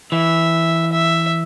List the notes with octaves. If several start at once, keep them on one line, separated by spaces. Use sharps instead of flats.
E3 E5
E5